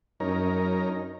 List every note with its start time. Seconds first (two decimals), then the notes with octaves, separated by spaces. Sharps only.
0.20 F#2 C#4 D#4 A#4